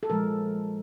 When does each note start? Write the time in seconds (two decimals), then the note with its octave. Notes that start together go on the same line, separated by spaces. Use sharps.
0.03 A4
0.09 A#2 F3 G#3 A#4